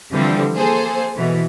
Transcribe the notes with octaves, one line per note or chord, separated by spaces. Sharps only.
D3 E3 F3 G3 C4 A4
A#3 G#4 A4 C5
B2 E3